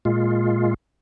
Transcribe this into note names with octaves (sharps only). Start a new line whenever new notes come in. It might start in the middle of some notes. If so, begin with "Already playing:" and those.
A#2 G#3 F4